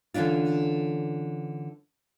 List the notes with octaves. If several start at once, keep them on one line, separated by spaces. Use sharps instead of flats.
D3 E3 C#4 D4 F4